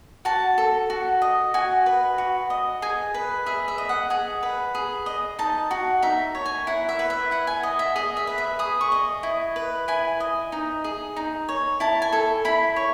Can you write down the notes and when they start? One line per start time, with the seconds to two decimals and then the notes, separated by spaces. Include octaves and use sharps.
0.25 F#4 A5
0.58 A4
0.90 F#4
1.22 D#5
1.54 F#4 G#5
1.86 B4
2.18 F#4
2.50 D#5
2.82 G#4 G#5
3.14 B4
3.46 G#4 E5
3.68 E5
3.78 D#5
3.89 F#5
4.10 G#4 F#5
4.43 B4
4.75 G#4
5.06 D#5
5.39 D#4 A5
5.71 F#4
6.02 D#4 E5
6.35 C#5
6.46 G#5
6.67 E4 F#5
6.89 E5
6.99 B4
7.10 E5
7.31 E4 F#5
7.47 G#5
7.63 D#5 F#5
7.79 E5
7.96 G#4 D#5
8.17 E5
8.27 B4
8.38 E5
8.59 G#4 D#6
8.81 C#6
8.92 D#5
9.23 E4
9.56 B4
9.88 E4 G#5
10.20 D#5
10.52 D#4
10.84 G#4
11.17 D#4
11.49 C#5
11.80 E4 A5
12.02 G#5
12.12 A4
12.45 E4 B5
12.76 C#5